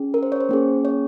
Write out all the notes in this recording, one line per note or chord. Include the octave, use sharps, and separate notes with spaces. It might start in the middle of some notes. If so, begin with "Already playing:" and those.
Already playing: C#4 G#4
A#4
C5
C#5
C5
A#3 C#4 G#4
C#5